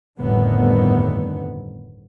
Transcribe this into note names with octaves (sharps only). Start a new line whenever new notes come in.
G1 F2 A2 D3 D#3 B3